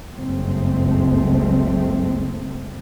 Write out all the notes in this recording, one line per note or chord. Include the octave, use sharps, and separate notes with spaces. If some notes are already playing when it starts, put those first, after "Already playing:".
F#1 C#2 G2 G#3 A3 C4